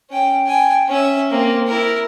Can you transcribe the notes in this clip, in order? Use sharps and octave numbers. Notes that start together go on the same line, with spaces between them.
C#4 G5
G5 G#5
C#4 E5
A#3 C4
E4 A#4